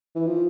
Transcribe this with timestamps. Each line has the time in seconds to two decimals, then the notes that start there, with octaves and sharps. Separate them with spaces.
0.15 E3
0.27 F3